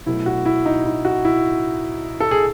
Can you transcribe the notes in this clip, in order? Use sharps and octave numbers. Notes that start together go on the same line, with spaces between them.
B2 F#3 A3 E4
F#4
E4
D#4
E4
F#4
E4
A4
G#4